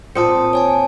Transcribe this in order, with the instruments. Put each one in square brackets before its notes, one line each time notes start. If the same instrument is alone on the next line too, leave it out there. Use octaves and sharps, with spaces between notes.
[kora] A#2 C4 [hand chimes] A5 D#6 C#7
[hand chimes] C#5 G#5 A5